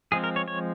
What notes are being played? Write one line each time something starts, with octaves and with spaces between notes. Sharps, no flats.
F3 G#3 C4 G#4
A#4
C#5
C#5